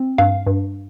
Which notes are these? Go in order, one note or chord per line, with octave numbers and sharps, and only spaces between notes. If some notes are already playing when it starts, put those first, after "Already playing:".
Already playing: C4
G2 F5
G2